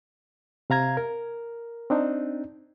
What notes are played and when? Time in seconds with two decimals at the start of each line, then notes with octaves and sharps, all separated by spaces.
0.70 C3 F5 A#5 G#6
0.97 A#4
1.90 C4 D4 D#4